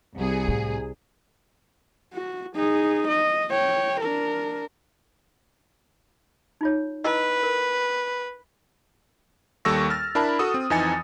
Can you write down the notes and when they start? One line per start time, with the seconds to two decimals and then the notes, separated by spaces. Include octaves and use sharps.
0.16 C2 G#4
0.48 A2
2.13 F#4
2.56 D#4 G#4
3.08 D#5
3.51 C#5 G5
4.01 D4 A#4
6.61 D#4 F4 C#5
7.04 E4 B4 D#5 E6
7.43 A#4
9.65 D#2 G3 A4 C#6 E6 A#6
9.90 F6 A6
10.15 D4 E4 A#4 A5 B5
10.39 F#4 A4 D#6
10.54 C4
10.70 F2 E3 D#4 G#5 A6 C#7